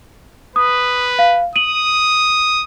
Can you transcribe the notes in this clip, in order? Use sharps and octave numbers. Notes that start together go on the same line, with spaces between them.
B4 D#6
F5
D#6 D#7 F#7